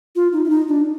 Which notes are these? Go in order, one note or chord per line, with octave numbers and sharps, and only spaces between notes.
F4
D#4
E4
D#4
D4